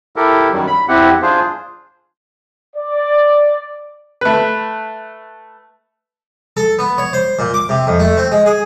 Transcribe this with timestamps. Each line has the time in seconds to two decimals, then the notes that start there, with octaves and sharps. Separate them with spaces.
0.16 E4 G4 A4 A#4
0.52 F#2 D#3 F#3 G3
0.67 B5
0.88 E2 C4 E4 G4 F#5
1.22 D4 F4 G#4 C5
2.76 D5
4.21 A3 B4
6.57 A4
6.79 B3
6.98 C#5
7.13 C5
7.39 A#2
7.54 D6
7.69 C3
7.87 F2
7.99 A3
8.18 C4
8.32 G#3
8.46 G#4